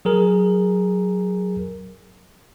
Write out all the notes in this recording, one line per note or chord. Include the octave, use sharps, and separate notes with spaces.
F#3 G#4 A#4